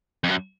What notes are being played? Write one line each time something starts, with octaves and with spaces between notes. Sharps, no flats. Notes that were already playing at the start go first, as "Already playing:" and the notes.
F2
F#2